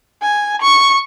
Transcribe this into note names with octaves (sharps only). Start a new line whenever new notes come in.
G#5
C#6